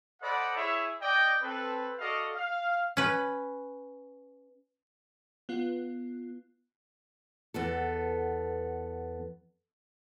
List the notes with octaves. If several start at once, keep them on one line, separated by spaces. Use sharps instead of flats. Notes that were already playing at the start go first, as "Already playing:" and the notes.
A4 C5 D5 D#5 F#5 B5
E4 G#4 C#5 E5
D5 D#5 G5
C4 A4 B4
F#4 A4 D5 D#5 F5
F5
C#4 B4
B3 F4
E2 B3 A4